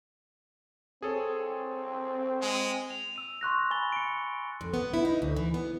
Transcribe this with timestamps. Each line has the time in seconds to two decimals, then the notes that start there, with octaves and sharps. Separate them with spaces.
1.02 C4 G#4 A4 C#5
2.42 G#3
2.91 F7
3.16 E6 D#7
3.41 C6 C#6 F#6 A#6
3.71 G#5 B5 A6 G7
3.92 C#7 D7
4.61 F2
4.74 B3
4.94 E4
5.05 D#4
5.22 D2
5.36 E3
5.54 B3